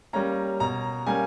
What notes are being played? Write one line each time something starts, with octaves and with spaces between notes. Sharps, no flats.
G3 A#3 C#4 A#5
B2 A#5
G3 A#3 C#4 G#5